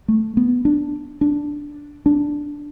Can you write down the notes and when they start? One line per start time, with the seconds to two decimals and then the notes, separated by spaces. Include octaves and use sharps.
0.08 A3
0.37 B3
0.65 D4
1.21 D4
2.06 D4